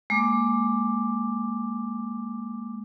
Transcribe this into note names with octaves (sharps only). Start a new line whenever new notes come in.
G#3 A#3 D6